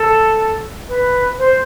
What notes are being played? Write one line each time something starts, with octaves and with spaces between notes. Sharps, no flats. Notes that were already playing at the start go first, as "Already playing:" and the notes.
Already playing: A4
B4
C5